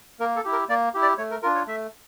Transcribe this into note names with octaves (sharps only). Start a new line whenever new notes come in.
A#3 A#4
A4
E4 G4
A#4
A#3 D5
E4 G4
D5
A3 C#5
A#4
D4 F4 A#4
C#5
A3 E5